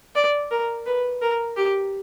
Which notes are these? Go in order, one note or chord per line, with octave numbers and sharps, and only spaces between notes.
D5
A#4
B4
A#4
G4